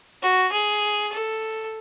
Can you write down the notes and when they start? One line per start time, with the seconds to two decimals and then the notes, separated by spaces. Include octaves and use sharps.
0.23 F#4
0.52 G#4
1.12 A4